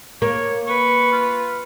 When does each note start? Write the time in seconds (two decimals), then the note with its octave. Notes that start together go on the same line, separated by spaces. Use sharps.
0.22 A#3 C#5
0.67 B4 C#6
1.12 F4